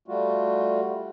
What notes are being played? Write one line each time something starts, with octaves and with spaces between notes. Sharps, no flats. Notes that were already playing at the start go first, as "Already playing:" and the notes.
G3 A3 F4 F#4